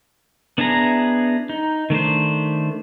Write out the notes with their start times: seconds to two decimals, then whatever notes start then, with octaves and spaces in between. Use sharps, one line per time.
0.58 B3 D4 E4 G#4 A#5
1.49 D#4
1.90 D#3 A3 D4 C5